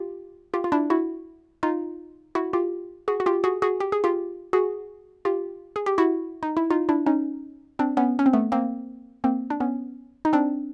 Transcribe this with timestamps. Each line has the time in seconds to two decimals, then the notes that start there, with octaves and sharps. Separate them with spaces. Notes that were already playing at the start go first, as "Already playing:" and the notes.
Already playing: F4 G4
0.54 F4 G4
0.64 F4
0.72 D4 E4
0.90 E4 F#4
1.63 D#4 F4
2.35 E4 F#4
2.53 F4 G4
3.08 F#4 G#4
3.20 F#4
3.26 F4 G4
3.44 F#4 G#4
3.62 F#4 G#4
3.80 G4
3.92 G#4
4.04 F4 G4
4.53 F#4 G#4
5.25 F4 G4
5.76 G#4
5.86 G4
5.98 E4 F#4
6.43 D#4
6.57 E4
6.70 D#4 F4
6.89 D4 E4
7.06 C#4 D#4
7.79 C4 D4
7.97 B3 C#4
8.19 C#4
8.26 C4
8.33 A3 B3
8.52 A#3 C4
9.24 A#3 C4
9.50 D4
9.60 B3 C#4
10.25 D#4
10.33 C4 D4